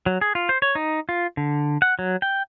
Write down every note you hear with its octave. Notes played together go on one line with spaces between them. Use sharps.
F#3
G#4
F4
C5
C#5
D#4
F4
D3
F#5
F#3
G5